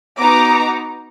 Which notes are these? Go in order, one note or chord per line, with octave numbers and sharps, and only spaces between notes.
B3 D#4 F#4 A#5 D6